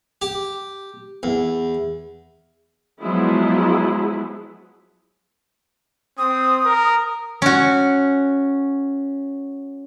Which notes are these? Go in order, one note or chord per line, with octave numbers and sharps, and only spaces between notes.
G4
E2
F3 F#3 G#3 B3 E4 G#4
C4 D#6
A#4
C#4 F#4